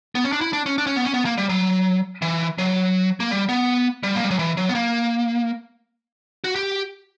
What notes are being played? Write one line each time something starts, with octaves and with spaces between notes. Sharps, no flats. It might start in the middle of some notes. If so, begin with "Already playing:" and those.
B3
C#4
D4
E4
D4
C#4
D4
C#4
B3
C#4
B3
A#3
G3
F#3
E3
F#3
A#3
G3
B3
G3
A#3
G3
F#3
E3
F#3
B3
A#3
F#4
G4